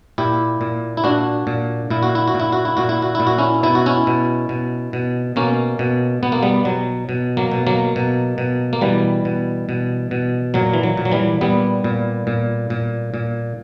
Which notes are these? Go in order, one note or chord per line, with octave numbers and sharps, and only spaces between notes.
A#2 E4 G4
A#2
E4
A#2 D4 F#4
A#2
A#2 E4
F#4
E4
F#4
A#2
E4
F#4
E4
A#2 F#4
E4
F#4
A#2 E4
F#4
C#4 E4
B2 E4
F#4
C#4 E4
B2
B2
B2
B2 A#3 C#4
B2
B2 B3
A#3
G3 B3
B2 F#3
B2
F#3 A#3
B2
F#3 A#3
B2
B2
A#3
B2 E3 G3
B2
B2
B2
A#2 F#3
E3
F#3
A#2
F#3
E3 G3
A#2 G3 B3
A#2
A#2
A#2
A#2